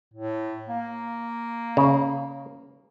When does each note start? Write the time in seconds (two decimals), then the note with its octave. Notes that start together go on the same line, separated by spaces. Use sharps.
0.14 A2
0.69 A#3
1.77 C#3